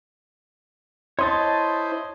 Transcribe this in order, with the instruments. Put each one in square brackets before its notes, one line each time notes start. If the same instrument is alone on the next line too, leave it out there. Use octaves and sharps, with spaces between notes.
[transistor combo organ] E4 C5 [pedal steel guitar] C#5 D#5 A5 [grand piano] C6